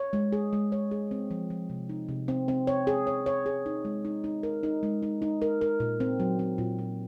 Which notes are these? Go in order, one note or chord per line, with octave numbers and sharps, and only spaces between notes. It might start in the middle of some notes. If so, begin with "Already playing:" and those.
Already playing: C#5
G#3
G#4
G#3
C#5
G#4
C4
F3
F3
C3
D#4
C3
C4
C4
C#5
G#4
C#5
C#5
G#4
D#4
G#3
D#4
D#4
A#4
D#4
G#3
D#4
D#4
A#4
A#4
A#2
C4
F#3
C4
A#2
A#2